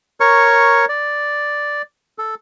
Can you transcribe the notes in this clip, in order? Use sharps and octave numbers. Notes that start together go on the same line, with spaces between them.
A#4 C#5 C#6
D5
A4